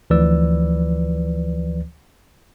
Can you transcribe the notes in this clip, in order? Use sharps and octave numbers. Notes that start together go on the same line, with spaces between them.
D2 E3 F3 B4 D5 E6